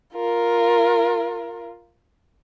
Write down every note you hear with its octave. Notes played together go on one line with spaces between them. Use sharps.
F4 A#4